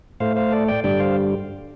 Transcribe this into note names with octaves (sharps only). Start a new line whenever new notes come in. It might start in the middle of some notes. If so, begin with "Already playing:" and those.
A2 A3 C5 F5
C5 F5
A4 D5
D5 G5
G2 D3 G3 D5 G5
C5 F5